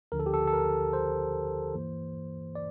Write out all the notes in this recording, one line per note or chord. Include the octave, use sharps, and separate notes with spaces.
D2 D3 F3 A#4
A4
G4
A4
A4
A#4
C5
G2 E3 A#3
D5